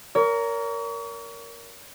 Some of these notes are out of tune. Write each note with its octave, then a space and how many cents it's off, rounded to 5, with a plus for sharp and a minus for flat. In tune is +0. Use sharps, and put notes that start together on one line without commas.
A#4 +0 C#5 +40